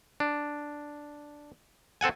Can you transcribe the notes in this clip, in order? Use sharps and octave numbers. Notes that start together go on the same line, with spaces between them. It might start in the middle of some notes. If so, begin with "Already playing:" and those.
D4
C4 A4 F#5 G#5